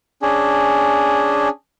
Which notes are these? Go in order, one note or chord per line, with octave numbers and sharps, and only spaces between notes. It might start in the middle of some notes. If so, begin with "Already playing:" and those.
C#4 D4 G#4